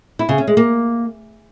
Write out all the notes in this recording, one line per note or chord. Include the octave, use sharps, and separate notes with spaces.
E4
C#3
C#4
G#3
A#3